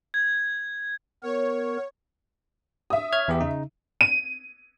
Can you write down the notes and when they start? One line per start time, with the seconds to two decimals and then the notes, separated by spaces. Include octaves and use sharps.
0.14 G#6
1.23 B3 A#4 C#5
2.90 E5 D#6
3.13 C#5 F6 G#6
3.28 E2 B3 G4
3.41 C#3 D#4
4.01 D#7